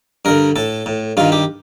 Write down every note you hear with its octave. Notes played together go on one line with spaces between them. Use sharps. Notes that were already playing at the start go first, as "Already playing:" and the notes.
G2 D3 A#4
A2 A4
A2
G2 D#3 F4
G4